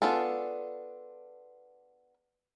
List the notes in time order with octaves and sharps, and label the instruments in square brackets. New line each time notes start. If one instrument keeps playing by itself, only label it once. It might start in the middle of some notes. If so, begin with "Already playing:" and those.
[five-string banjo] B3 D4 F4 G#4 A4